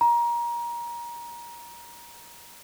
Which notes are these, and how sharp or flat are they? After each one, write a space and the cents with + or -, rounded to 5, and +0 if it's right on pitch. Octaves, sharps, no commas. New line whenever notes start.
A#5 +25